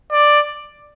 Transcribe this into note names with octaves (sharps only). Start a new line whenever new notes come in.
D5